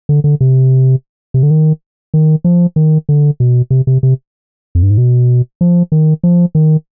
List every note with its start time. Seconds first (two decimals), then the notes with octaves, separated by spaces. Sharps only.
0.09 D3
0.24 D3
0.41 C3
1.34 C3
1.43 D3
1.51 D#3
2.14 D#3
2.44 F3
2.76 D#3
3.09 D3
3.40 B2
3.71 C3
3.87 C3
4.03 C3
4.75 F2
4.83 G2
4.90 G#2
4.98 B2
5.61 F3
5.92 D#3
6.24 F3
6.55 D#3